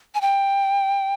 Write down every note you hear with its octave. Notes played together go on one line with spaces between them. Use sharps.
G#5
G5